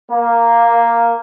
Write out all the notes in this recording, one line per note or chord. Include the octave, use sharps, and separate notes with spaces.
A#3